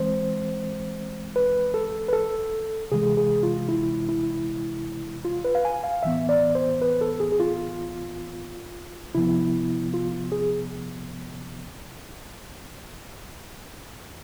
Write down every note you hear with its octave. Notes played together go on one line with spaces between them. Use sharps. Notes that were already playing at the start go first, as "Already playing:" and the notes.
Already playing: E3 G#3 C4 C5
B4
A4
B4
A4
C3 E3 G#3 G#4
G#4
F4
E4
E4
F4
B4
F5
G#5
F5
A2 E3 B3 E5
D5
C5
B4
A4
G#4
G#4
F4
C3 F3 B3 E4
F4
G#4